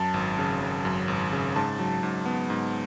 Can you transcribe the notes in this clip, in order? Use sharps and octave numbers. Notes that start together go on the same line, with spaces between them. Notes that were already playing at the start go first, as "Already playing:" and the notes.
Already playing: F#2 F#3 A5
G#1
C#3
F#3
F#2
G#1
C#3
G#2 A5
F#3
G#2
B3
G#2